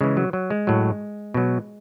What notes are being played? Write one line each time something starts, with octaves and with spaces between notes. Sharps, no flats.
C#3 E3 G#3
F#3
F#3
G#3
A2 F#3
B2 F#3